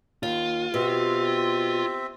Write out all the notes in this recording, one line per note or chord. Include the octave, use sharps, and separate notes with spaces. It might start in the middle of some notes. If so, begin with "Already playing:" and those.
D#2 F4
B2 C4 G4 E5